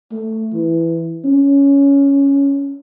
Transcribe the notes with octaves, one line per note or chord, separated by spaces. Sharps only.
A3
E3
C#4